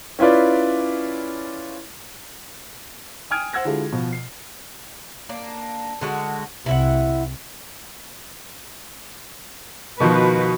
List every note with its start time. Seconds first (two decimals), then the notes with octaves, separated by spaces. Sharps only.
0.19 C#4 E4 F4 B4 D5
3.30 G5 G#5 D#6 F6 G#6 D7
3.53 C5 F#5 E6 G#6 A#6
3.65 D3 G#3 E4 F4 G4 A4
3.92 B2 F3
4.13 C7
5.29 A#3 D4
6.01 D3 G#3 F#4
6.66 C2 C3 E4 E5 F#5
10.00 B2 D#3 F3 F#4 B4